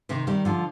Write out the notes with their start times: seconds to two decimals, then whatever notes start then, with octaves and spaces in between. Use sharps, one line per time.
0.09 C3 D#3
0.27 D#3 G3
0.45 D3 F3